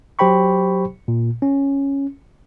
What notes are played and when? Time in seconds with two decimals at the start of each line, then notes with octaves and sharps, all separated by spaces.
0.19 F#3 G4 C5 G5 B5 C#6
1.08 A#2
1.42 C#4